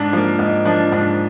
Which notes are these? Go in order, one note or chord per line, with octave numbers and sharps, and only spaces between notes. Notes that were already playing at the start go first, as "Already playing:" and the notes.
Already playing: G#2 D4
F3 A#3
G#2 D#4
F3 A#3 D4
G#2 D4